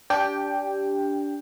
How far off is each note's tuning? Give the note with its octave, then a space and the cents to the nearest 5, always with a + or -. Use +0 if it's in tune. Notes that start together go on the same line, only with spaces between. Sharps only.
D4 -20 G4 -5 G5 +10